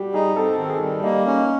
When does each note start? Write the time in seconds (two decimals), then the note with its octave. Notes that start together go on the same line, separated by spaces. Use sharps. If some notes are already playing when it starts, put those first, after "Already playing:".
Already playing: G3 F#4 G4
0.14 D#4 G#4
0.36 C4 A4
0.58 D#3
0.70 G#4
0.81 G3
1.04 A#3 D#4
1.26 C#4
1.38 D#4